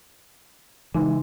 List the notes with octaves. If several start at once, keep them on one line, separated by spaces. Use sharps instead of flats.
C#3 E3 G#3 D#4